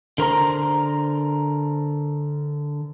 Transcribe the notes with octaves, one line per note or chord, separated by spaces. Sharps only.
D3 A#4 C5 A#5